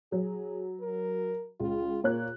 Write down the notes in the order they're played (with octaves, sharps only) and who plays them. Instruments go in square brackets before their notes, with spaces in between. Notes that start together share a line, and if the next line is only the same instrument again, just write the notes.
[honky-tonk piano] F#3 [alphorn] G#4
[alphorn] A#4
[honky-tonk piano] C#2 [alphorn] F4
[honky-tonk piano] A#2 C#5 F#6 [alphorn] A#3